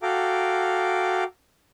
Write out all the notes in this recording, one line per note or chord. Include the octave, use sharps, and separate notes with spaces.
F#4 A4 F5 G5 A#5 D6